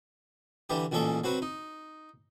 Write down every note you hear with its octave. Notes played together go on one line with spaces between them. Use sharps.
D3 E3 G3 G4
A1 A#2 G#3 C#4 A4 D6
F#3 C4 F#4 B4
D#4